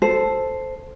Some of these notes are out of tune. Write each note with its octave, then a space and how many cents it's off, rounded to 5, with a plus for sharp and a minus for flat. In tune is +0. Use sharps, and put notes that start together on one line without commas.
A4 +0 C5 +0